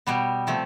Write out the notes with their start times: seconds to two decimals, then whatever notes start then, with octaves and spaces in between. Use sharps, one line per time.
0.07 B2 G3 B3
0.47 C3 F3 A3